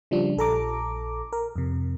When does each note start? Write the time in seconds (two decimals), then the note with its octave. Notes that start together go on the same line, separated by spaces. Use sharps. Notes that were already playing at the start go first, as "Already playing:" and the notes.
0.11 C#3 F3 G3 D4
0.37 A#1 A4 A#5 D6
1.33 A#4
1.56 F2 C3